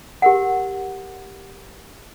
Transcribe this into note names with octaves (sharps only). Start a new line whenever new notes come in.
G4 A#4 F#5